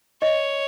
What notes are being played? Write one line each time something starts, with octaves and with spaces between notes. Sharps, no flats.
C#5 D#5